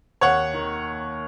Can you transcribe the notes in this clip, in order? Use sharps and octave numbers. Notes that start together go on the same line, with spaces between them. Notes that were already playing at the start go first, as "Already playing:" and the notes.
D#2 C#5 F#5
D#3